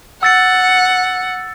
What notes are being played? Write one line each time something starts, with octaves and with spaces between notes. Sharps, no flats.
F#5 E6 A6 C#7